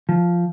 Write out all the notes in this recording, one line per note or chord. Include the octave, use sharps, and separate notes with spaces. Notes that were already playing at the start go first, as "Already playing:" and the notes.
F3